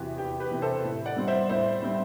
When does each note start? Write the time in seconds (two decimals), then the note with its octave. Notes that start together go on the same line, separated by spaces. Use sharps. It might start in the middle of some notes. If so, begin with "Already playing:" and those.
Already playing: E2 C3 E3 F#4 G4 B4
0.18 E2 G4
0.40 G4 B4
0.51 C3 E3
0.62 A4 C5
0.84 A2
1.06 D5 F#5
1.16 G3 C4
1.27 C5 E5
1.49 A2 C5 E5
1.83 G3 C4